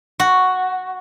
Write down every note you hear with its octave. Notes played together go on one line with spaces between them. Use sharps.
F#4